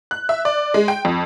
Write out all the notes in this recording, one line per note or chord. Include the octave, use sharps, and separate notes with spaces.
F#6
E5
D5
G#3
G5
F2